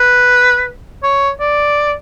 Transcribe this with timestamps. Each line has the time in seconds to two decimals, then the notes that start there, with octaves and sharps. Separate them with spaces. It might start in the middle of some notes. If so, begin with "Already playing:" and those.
Already playing: B4
1.03 C#5
1.40 D5